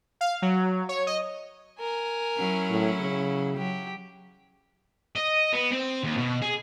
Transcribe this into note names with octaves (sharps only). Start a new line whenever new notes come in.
F5
F#3
C#5
D#5
A#4 G#5
F#3 C#4 E4
A2
C#3
F#3 G4
D#5
B3
C4
D#2
B2
G#4